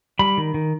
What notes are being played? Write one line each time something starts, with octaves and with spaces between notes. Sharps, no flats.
G3 B5
D#3
D#3